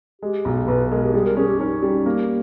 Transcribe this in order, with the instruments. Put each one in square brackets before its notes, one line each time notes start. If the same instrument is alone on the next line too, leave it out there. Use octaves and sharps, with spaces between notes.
[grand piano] G#3 [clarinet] G4
[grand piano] B1
[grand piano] B1 [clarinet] B4
[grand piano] G#3 [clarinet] A#4
[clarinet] G4
[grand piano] G3 [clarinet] G#4
[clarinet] A#4
[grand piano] C#4 [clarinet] G#4
[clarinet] G4
[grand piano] C#4 [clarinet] D#4
[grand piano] G3
A#3